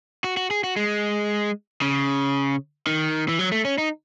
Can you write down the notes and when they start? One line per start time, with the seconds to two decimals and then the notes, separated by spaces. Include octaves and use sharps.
0.24 F#4
0.37 F#4
0.51 G#4
0.64 F#4
0.76 G#3
1.82 C#3
2.87 D#3
3.29 E3
3.39 F#3
3.52 A3
3.65 C#4
3.78 D#4